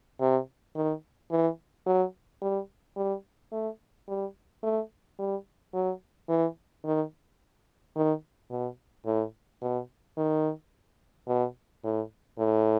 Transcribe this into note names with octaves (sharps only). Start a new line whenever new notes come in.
C3
D#3
E3
F#3
G3
G3
A3
G3
A3
G3
F#3
E3
D#3
D#3
B2
A2
B2
D#3
B2
A2
A2